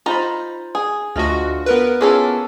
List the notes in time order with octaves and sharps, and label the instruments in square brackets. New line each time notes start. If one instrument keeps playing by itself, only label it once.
[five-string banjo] D#4 A#5 [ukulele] F4 C5 B5
[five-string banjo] G#4
[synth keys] D2 F#4 [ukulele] D4 F4 D#5
[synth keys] B3 A#4 B4
[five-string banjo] A#3 C#4 A4 [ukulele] E4 F4 G#4